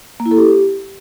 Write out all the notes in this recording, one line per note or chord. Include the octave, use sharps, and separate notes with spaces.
A#3
E4
A4
G4